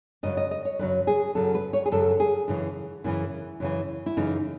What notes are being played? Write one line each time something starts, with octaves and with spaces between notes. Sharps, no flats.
F#2 C#3 F#3 D#5
D#5
D#5
C#5
F#2 C#3 F#3 B4
G#4
F#2 C#3 F#3 A4
B4
C#5
G#4
F#2 C#3 F#3 A4
G#4
F#2 C#3 E3
F#2 C#3 E3 E4
F#2 C#3 E3
E4
F#2 C#3 E3 D#4